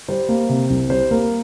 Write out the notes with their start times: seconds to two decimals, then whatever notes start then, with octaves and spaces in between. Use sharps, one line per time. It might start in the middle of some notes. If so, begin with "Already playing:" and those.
0.08 G3 C5
0.29 A#3
0.49 C3
0.70 C2
0.90 G3 C5
1.11 A#3 A#4